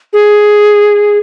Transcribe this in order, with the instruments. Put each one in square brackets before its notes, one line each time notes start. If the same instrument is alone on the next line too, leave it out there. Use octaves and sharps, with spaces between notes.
[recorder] G#4